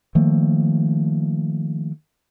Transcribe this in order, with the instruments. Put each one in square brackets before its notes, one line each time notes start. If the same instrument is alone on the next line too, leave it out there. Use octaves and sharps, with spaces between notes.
[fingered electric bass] D#3 F3 A3 A#3